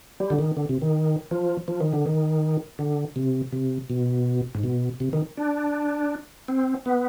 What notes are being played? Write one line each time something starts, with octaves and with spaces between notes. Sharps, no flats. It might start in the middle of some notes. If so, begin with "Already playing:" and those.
G3
D3
D#3
D3
C3
D#3
F3
F3
D#3
D3
D#3
D3
C3
C3
B2
G#2
B2
C3
D#3
D4
C4
B3